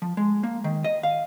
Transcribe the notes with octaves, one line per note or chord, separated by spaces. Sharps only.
F3
G#3
A#3
D#3
D#5
F5